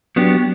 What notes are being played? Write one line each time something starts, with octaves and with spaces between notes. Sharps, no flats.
F#3 B3 D4 G4